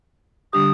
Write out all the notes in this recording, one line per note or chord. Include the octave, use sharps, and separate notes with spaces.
D3 G3 D4 G4 D#6